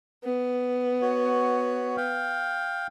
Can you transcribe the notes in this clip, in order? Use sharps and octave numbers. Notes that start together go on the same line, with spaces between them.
B3
F#4 C#5
F5 G5